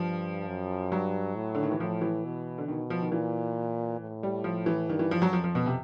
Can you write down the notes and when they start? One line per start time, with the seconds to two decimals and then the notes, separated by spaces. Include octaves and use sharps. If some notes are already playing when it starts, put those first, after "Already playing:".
Already playing: G2 F3
0.48 F#2
0.92 G2 F#3
1.36 A2
1.55 D3
1.63 D#3
1.72 E3
1.80 A2 F3
2.01 E3
2.25 B2
2.58 D3
2.68 B2 D#3
2.90 F3
3.02 D#3
3.12 A#2 E3
4.00 A2
4.23 G3
4.44 F3
4.66 E3
4.89 G2 D#3
4.99 E3
5.11 F3
5.22 F#3
5.33 F2 F3
5.44 F3
5.55 B2
5.66 C3